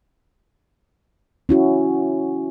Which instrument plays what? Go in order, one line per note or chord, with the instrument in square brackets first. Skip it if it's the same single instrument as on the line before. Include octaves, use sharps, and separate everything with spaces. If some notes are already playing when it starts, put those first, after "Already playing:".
[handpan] C#4 E4 F#4